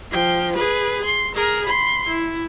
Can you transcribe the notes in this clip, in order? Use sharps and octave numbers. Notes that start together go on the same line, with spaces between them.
F3 G5
G#4 B4
C6
G#4 A#4
B5 C6
E4